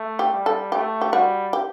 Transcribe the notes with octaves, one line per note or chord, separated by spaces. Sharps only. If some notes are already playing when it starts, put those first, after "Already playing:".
Already playing: A3
G4
G3
A4
A3 G4
G4
G3 F#4
G4